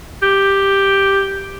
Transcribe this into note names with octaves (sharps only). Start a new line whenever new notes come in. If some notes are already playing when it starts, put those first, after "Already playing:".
G4